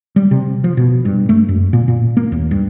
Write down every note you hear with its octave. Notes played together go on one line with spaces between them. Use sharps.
G3
C3
F3
B2
G2
A3
F#2
A#2
A#2
A#3
D#2
G2